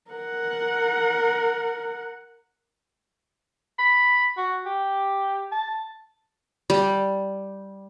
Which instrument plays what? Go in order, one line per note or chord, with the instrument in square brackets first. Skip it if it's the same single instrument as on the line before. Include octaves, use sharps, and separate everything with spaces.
[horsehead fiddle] A#4 F#5
[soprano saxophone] B5
F#4
G4
A5
[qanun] G3